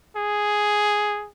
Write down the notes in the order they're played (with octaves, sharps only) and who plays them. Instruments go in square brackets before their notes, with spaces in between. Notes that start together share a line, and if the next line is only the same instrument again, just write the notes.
[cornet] G#4